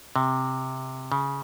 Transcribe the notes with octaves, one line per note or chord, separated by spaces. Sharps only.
C3
C#3